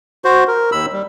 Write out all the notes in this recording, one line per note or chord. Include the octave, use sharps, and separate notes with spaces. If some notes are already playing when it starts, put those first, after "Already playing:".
F#4 C5
A#4
D#2 B5 E6
G3